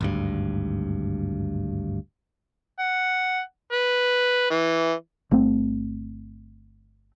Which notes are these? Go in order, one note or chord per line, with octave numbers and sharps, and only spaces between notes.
G#1 D2 G2
F#5
B4
E3
G1 A3 C4